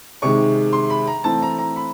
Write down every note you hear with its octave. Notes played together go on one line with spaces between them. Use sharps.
C3 D#3 G#3 C#6
C6
B5
A#5
E3 A3 C4 A5
A#5
A#5
B5